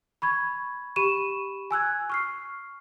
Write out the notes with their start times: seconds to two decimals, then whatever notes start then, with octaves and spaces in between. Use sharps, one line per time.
0.22 B5 C#6 G#6
0.96 G4 B5 C#6 D#7 E7
1.71 G#5 E6 F#6 G#6
2.10 C#6 F6 C7